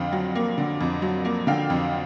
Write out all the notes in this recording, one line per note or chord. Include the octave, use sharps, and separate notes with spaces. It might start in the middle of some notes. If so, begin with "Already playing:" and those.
Already playing: F2 D3 F5 G5
F#3
A#3
D3
F2
F#3
A#3
D3 F5 G5
F2